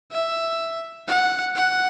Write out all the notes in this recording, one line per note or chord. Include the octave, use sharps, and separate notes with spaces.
E5
F#5
F#5